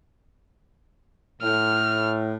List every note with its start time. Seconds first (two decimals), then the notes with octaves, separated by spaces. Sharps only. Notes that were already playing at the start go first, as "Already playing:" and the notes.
1.42 A2 F6